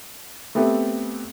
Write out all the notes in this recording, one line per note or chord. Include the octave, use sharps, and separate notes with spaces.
A3 B3 C4 G4 A4 E5